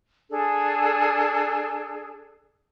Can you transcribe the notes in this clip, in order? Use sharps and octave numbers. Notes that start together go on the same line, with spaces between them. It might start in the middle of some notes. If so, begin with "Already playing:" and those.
D4 G#4 A4